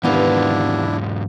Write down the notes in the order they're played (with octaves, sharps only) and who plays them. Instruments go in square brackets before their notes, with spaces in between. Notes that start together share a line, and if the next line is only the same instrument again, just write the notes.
[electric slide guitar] E2 G#2 F4 [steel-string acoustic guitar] C3 D#3 B3 [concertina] D4 E4